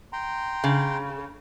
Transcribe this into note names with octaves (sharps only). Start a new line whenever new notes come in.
G5 A#5 C6
C#3